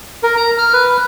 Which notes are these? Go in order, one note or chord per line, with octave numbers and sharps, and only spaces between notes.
A#4
A#5
F6
B4